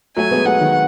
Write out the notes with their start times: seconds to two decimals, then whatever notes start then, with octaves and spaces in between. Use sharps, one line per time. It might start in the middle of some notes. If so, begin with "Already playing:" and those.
0.16 F#3 A3 G#5
0.31 G#3 B3
0.45 F#3 A3 F#5
0.60 D#3 F#3